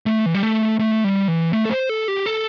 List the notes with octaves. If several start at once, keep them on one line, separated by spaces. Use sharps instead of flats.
A3
E3
G3
A3
A3
G3
E3
A3
A4
C5
A4
G4
A4